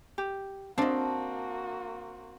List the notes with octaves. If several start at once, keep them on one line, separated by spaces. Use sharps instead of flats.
G4
A#3 C4 D4 F#4 D#5 F5 A5